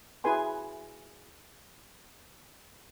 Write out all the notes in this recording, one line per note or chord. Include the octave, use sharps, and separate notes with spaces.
E4 F#4 G#4 B4 G#5 C6